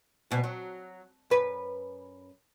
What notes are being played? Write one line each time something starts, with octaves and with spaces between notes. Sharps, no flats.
D2 B2
F#3
F#2 B4